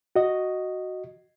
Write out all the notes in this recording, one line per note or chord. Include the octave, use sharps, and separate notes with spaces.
F#4 D#5